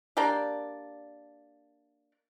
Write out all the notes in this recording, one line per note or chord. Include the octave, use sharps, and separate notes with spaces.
A#3 D4 G4 D5